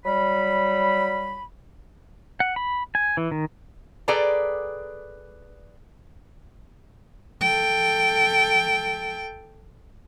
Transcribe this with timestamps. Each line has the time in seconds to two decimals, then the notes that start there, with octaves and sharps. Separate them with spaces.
0.05 F#3 G3 B5
2.40 F#5
2.56 B5
2.95 G#5
3.17 E3
3.31 D#3
4.08 G#4 A4 B4 D5 G5 A#5
7.41 A4 G5